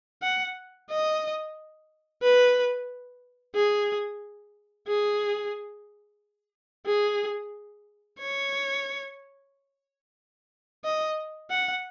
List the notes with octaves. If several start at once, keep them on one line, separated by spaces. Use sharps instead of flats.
F#5
D#5
B4
G#4
G#4
G#4
C#5
D#5
F#5